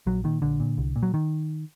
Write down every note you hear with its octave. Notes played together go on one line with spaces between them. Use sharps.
A#1 F#3
A#2 D#3
A#1 D3
A#2
C2
A#2
F#3
D#3